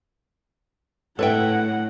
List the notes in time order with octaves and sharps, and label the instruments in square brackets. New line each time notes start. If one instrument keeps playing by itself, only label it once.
[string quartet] A2 [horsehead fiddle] E4 F#5 [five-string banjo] A4 B4 E5 [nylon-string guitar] C#5 G5